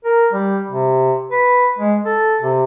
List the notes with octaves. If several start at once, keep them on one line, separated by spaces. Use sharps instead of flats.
A#4
G3
C3
B4
G#3
A4
C3